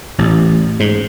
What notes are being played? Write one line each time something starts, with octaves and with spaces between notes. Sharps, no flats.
A1
G#2